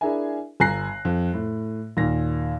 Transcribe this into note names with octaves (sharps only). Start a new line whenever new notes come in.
D4 E4 G#4 A#4 E5 G#5
G1 G#5 A#5 F#6 A#6 C7
F2
A2
D#2 A#2 F5 A#6